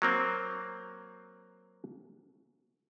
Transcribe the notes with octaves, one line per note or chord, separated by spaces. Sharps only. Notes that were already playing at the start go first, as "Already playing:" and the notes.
F#3 A#3 C4